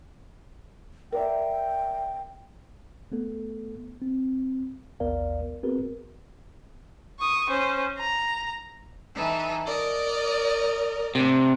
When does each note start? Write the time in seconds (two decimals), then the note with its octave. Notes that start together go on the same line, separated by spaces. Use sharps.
1.12 A#4 D5 E5 G5
3.12 A3 B3 A4
4.02 C4
5.00 A1 D#2 B3 A#4 D5 F5
5.63 B3 C4 F#4 G#4 A#4 B4
7.20 C#6 D#6
7.50 C#4 C5
7.98 A#5
9.14 E3 D#4 A4
9.64 A#4 D5 D#5
11.15 A2 C3 D4